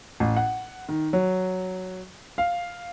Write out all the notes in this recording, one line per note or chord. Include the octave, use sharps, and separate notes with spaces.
A1
F#5
D#3
F#3
F5